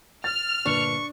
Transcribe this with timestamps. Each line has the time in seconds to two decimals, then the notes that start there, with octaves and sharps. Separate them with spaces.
0.24 F6 A6
0.66 G1 A#2 D4 B4 C#6